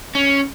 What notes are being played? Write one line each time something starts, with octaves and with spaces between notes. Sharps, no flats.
C#4